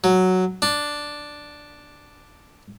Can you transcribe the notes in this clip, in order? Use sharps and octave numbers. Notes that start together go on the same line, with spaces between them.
F#3
D4